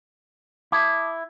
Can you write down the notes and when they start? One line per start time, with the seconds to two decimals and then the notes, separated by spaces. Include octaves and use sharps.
0.72 E4 A5 D6 D#6